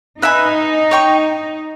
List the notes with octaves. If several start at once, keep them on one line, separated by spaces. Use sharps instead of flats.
D#4 B4 E5 G#5 B5
C#5 G5 C#6